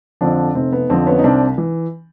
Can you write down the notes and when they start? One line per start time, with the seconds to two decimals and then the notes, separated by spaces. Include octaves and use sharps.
0.21 F2 D3 F3 C4 D4
0.55 F1 C4
0.73 B3
0.90 F2 D3 F3 C4
1.07 B3 C#4
1.19 D#4
1.24 C2 C4 D4
1.58 E3